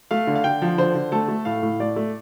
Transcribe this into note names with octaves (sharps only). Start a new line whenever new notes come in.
A3 F5
D3
F5
D3 G5
F3
D3 C5
D3
A3 A4
A3
A2 F5
A2
A3 D5
A3